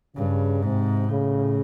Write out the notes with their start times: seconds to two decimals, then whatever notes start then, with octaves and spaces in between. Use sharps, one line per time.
0.16 G2 C#3
0.62 G#2 C3
1.08 A2 C#3